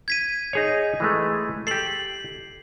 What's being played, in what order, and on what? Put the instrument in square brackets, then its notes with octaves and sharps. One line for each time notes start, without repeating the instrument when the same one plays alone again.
[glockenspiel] G#6 B6 D#7
[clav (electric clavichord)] D#4 G#4 C#5
E3 G#3 A3
[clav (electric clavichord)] G4 A4 [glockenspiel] C7 F#7